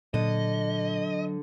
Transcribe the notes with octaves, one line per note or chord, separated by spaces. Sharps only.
A#2 D3 F#3 D#5